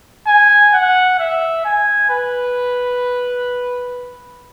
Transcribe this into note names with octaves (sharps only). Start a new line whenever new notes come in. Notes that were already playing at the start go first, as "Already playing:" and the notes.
G#5
F#5
E5
G#5
B4